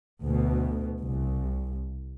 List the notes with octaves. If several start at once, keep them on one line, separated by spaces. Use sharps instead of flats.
D2 B2
C2